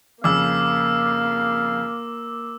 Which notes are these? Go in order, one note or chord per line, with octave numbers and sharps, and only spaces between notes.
F2 C#3 A#3 F5 D6 E6